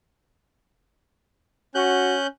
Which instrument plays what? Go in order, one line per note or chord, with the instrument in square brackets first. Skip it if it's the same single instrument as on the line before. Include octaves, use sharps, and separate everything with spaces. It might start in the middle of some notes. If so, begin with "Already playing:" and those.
[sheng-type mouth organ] C#4 F#6 G6 [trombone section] F#4